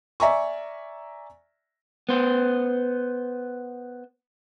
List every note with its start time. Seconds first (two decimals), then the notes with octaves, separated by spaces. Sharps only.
0.20 D5 E5 G#5 A#5 C#6
2.09 B3 C5